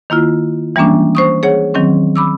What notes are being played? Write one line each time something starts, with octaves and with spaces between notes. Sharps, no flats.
D#3 A#3 E4 F4
E3 G3 G#3 A#3 C#4 D4
C5 C#6 D#6
G#4 C#5 F#5
D#3 F#3 C4 C#4
B5 D6 E6